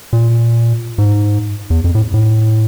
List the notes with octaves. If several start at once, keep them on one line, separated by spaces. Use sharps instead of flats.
A#2
G#2
E2
F2
A2
A2